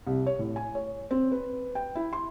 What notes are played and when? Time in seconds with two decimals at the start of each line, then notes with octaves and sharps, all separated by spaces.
0.07 C2
0.26 C#5
0.39 A2
0.56 G#5
0.75 C#5
1.11 C4
1.32 B4
1.75 G5
1.95 E4
2.13 C6